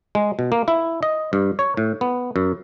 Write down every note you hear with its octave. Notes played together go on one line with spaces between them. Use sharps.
G#3
B2
A#3
E4
D#5
G2
C#5
A2
B3
F#2